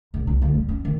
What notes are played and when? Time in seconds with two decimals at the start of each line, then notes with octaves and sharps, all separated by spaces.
0.14 A#1
0.27 C2
0.42 D2
0.54 G3
0.69 C#4
0.85 D#3